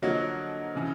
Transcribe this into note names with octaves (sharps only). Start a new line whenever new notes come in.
D3 F3 F#3 A#3 D#4 F#4
C#3 E3